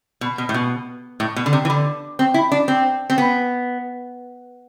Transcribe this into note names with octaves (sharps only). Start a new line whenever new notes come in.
B2
B2
A2
B2
A2
B2
D3
C3
E3
D3
C4
E4
D4
C4
C4
B3